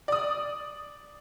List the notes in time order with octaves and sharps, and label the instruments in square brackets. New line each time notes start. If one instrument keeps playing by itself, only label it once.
[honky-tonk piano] D5 D#6